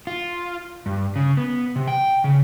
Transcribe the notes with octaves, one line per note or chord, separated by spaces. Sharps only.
F4
G2
C#3
B3
C3
G5
C#3